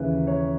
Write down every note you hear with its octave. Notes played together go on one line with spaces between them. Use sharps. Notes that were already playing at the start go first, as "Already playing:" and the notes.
Already playing: D#2 C#3 E3 B4
C#5